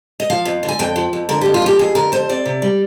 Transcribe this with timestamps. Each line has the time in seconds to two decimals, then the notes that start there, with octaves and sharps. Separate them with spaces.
0.20 D#5
0.30 F3 F5
0.45 F2
0.63 D3
0.68 G#5
0.79 F2 G5
0.96 F3
1.13 F2
1.29 D3 A#4
1.41 F2 G4
1.54 F4
1.62 F3 G4
1.79 F2 G#4
1.95 D3 A#4
2.12 F2 C5
2.29 C4 D5
2.46 C3
2.62 G3